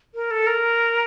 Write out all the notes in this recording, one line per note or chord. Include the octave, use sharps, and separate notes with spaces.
A#4
A4
A#4